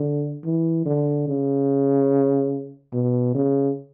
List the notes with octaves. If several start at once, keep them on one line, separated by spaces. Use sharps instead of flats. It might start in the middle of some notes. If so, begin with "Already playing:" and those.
Already playing: D3
E3
D3
C#3
B2
C#3